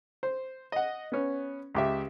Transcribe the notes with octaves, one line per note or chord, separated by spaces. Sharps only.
C5
D#5 F#5
B3 C#4
C#2 G4 E5